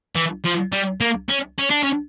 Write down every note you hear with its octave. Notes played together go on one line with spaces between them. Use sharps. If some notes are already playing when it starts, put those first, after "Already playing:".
E3
F3
G3
A#3
C#4
C#4
D4
C#4